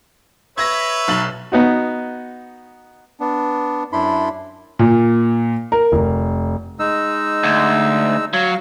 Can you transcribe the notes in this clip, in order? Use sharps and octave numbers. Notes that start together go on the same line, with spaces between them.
B4 C#5 E5 G#6 A#6
B1 A6 F#7
B3 D#4 F#4
B3 D4
F#2 D4 E4 B5 C6
A#2
A#4
F1
G#3 D#4 E6
D2
F#3 F5